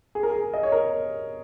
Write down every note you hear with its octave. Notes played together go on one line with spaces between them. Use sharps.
G#4
A#4
G#4
D#5
C#5
A#4